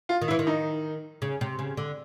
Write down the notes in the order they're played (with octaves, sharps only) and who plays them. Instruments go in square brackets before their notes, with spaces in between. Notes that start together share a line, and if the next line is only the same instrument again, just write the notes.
[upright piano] F4
[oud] D#3
[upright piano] E4
[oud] E3
D#3
[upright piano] D#4
[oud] C#3
C3
C#3
D3